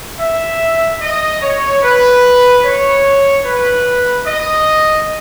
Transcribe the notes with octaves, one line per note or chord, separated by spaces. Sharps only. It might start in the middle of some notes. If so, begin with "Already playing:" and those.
E5
D#5
C#5
B4
C#5
B4
D#5